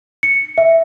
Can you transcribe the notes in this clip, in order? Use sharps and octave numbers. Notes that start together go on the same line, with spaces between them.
C#7
E5